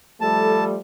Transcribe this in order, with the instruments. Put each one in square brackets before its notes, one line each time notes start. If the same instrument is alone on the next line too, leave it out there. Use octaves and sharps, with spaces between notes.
[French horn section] F3 G3 A3 [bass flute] A4 [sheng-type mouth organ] A5